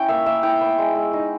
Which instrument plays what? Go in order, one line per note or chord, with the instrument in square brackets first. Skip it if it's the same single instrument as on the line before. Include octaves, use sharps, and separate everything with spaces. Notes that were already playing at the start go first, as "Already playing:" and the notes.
Already playing: [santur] C#4 E4 G5
A#3 E5
A#3 E5
E4 G5
B3
G#3
G#3
D#4